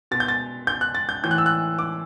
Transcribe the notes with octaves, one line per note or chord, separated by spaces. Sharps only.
B2 A6
G6
A6
G6
F#6
A6
G6
A2 E3 G6
F#6
E6
F#6
D6